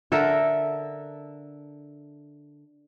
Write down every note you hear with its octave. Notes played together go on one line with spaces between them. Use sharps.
D3 A4 A#4 E5